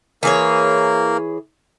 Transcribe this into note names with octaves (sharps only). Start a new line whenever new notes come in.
E3 A#3 G#4 A#4 C#5